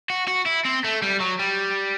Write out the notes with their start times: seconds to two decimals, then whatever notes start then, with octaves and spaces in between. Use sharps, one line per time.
0.10 F#4
0.28 F#4
0.46 E4
0.65 C4
0.84 A3
1.02 G3
1.20 F#3
1.39 G3